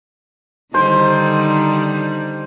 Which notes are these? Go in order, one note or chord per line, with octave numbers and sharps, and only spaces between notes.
D3 D#3 G3 D#4 C5